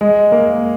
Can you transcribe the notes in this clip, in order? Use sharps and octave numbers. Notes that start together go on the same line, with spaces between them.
G#3
A#3